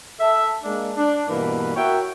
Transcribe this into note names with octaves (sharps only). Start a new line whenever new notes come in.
A4 E5
G#3 A#3 D4
D4
G2 B2 E3 A#3 B4
F#4 A#4 C#5 E5 G5